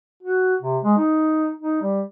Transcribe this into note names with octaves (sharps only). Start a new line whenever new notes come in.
F#4
C3
G#3
D#4
D#4
G3